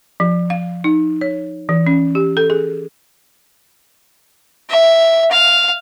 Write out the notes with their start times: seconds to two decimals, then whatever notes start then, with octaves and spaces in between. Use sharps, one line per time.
0.20 F3
0.50 F5
0.84 D#4
1.21 C#5
1.69 E3
1.87 C#4
2.15 G4
2.37 A4
2.50 G#4
4.70 E5
5.31 F5